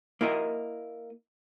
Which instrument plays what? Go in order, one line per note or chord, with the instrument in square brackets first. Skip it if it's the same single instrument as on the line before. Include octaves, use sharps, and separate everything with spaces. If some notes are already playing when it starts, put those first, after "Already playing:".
[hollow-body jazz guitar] A#3 E4 A#4 D#5